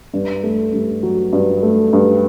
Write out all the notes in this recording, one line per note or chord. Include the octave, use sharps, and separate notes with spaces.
G2
A3
G2
F#3
G2
A3
G2